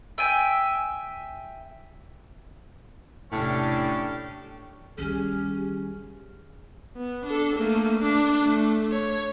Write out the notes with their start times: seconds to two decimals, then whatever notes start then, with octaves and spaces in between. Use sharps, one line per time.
0.18 E5 G5 G#5
3.32 E1 A2 C3 C#4 D4 G4
4.98 D#3 G3 C#4 G4 G#4
6.96 B3
7.26 D4 A4
7.56 A3 A#3
7.99 D4
8.43 A3
8.92 C#5